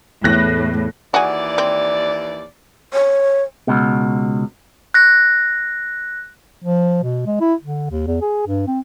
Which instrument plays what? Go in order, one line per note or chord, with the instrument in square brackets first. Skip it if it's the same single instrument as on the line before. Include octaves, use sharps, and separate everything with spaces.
[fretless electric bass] E2 [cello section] A2 [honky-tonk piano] F#6 A#6
[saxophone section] D#2 E3 D5 [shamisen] F#4 G#4
[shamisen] C4
[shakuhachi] C#5
[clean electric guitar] C#2 B2
[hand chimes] F#6 A#6
[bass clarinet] F3
B2
G#3
E4
D3
D#2
E2
G#4
G2
C4